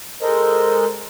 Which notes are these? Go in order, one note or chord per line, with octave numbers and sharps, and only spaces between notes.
G#3 A4 A#4 C5 D#5